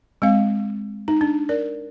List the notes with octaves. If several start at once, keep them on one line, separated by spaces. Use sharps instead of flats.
G#3 C4 F5
D#4
D4
A#4 D5